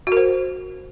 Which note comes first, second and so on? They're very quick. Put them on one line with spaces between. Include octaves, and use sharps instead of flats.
F#4 A#4 C5